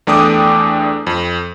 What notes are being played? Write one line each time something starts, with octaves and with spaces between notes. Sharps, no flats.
E2 A3 D4 G5 D6 D#6
F2